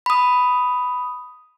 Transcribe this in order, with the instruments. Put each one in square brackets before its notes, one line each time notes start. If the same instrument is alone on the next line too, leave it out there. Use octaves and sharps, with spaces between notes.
[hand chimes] B5 D#6